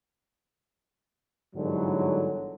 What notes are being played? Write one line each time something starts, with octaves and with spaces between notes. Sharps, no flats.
G1 G#2 D3 E3 F#3